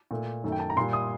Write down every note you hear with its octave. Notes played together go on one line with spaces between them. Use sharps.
A#2 A3
F#2 D#3 A3
G5
A5
A#5
A#2 G3 C6
D#6